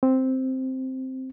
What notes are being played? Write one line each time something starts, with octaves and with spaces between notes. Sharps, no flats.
C4